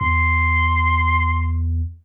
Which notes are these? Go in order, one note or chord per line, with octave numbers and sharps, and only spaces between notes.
E2 C6